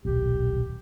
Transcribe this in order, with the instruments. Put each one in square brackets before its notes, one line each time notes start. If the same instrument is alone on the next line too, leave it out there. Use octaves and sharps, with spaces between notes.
[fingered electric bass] D#1 B1 [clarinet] G4